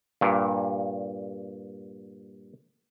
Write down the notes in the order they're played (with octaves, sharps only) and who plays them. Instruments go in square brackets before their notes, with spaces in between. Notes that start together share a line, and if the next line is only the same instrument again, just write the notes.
[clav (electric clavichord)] G2 A#2